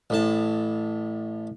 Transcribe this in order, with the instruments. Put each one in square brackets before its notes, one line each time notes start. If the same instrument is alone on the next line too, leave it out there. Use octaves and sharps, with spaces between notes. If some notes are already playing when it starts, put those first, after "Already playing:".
[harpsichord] A1 A2 A5